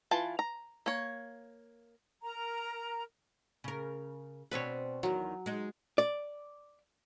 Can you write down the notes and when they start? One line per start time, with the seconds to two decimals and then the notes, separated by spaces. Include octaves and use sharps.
0.11 E3 F4 A5
0.39 A#5
0.86 A#3 C#5
2.23 A#4 A#5
3.64 C#3 A#4
4.51 B2 C4 D4 B4 C#5
5.03 E2 D#3 F#3
5.46 G#3 D#4
5.98 D5